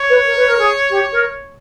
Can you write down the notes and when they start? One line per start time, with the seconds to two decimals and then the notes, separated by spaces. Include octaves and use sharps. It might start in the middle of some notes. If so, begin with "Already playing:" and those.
Already playing: C#5
0.09 B4
0.24 A#4
0.36 B4
0.46 A#4
0.57 G#4
0.89 G4
1.12 A#4